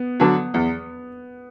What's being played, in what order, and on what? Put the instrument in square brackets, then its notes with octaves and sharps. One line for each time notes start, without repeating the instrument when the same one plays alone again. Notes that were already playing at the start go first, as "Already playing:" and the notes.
Already playing: [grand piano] B3
[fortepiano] D3 F#3
E2